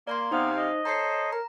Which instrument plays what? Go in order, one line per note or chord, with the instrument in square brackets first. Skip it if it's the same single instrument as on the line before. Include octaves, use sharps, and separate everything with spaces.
[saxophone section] A#3 [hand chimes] D5 A#5 C6
[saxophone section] C3 F5 [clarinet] B3 [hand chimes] D#4 C5
[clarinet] D#5
[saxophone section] A4 C5 C#5 [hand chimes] A#5 C7
[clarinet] A#4 [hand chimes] A#5